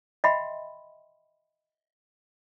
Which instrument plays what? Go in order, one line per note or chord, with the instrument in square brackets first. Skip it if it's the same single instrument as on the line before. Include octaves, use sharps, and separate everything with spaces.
[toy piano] D#5 E5 F#5 G5 B5 C6